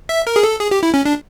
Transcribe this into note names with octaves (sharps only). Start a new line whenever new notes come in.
E5
A#4
G#4
A4
G#4
G4
E4
C#4
D4